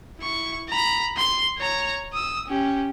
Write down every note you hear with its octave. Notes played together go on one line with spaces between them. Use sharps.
E4 C#6
A#5 B5
C6
C#5 A#5
D#6 E6
C#4 G4